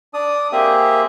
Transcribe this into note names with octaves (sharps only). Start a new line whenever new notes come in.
D4 D5 D#6
A#3 C4 G4 G#4 E5